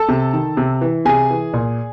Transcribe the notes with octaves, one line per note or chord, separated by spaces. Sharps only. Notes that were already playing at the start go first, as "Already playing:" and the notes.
Already playing: A4 A5
C3
D#3
C3
E3
C3 G#4 G#5
E3
A#2